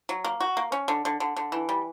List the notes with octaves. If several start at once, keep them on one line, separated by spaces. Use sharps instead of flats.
F#3
A#3
F#4
A#3
C#4
D3
D3
D3
D3
E3
G3